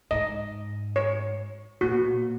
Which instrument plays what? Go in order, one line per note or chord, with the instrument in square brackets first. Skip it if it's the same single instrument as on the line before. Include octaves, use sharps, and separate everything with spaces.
[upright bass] G#2 [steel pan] D#5
[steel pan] C#5
[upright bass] A#2 [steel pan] F#4
[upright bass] B2
A#2